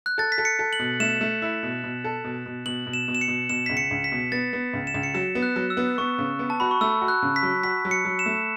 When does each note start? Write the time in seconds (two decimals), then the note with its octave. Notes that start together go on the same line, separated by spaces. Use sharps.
0.06 F#6
0.18 A4 A6
0.32 B6
0.38 A4
0.45 C#7
0.59 A4
0.73 F#7
0.79 B2
1.00 A3 E7
1.21 A3
1.42 E4
1.63 B2
1.83 B2
2.04 A4
2.24 B2
2.46 B2
2.66 B2 F#7
2.86 B2
2.93 E7
3.08 B2
3.15 E7
3.21 C#7
3.28 B2
3.49 B2 E7
3.66 C#2 B6
3.77 C#7
3.91 C#2
4.04 B6
4.12 B2
4.32 B3 A6
4.53 B3
4.74 C#2
4.87 E7
4.94 C#2
5.03 C#7
5.14 F#3 E7
5.35 B3
5.43 F#6
5.56 F#3
5.70 E6
5.77 B3
5.98 B3 C#6
6.18 C#3
6.39 B3
6.50 A5
6.60 F#4 B5
6.71 C#6
6.81 A3 E6
7.01 F#4
7.08 F#6
7.22 C#3
7.36 B6
7.43 F#3
7.64 F#4 B6
7.85 F#3
7.91 C#7
8.05 F#3
8.19 E7
8.26 A3